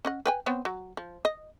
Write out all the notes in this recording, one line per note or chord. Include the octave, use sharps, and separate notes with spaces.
C#4 D#5 F#5
B4 G5 G#5
B3 C4 C#5
F#3
F3
D#5